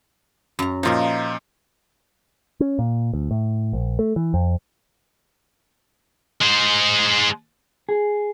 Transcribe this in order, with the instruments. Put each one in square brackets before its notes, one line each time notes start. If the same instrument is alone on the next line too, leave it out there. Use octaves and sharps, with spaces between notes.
[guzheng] F#2 A#5
[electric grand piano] A#2 F3 [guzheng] D#4 F4 A#4
[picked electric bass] C#4
A#2
D2
A2
A#1
A3
E3
F2
[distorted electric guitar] G#3 C5
[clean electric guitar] G#4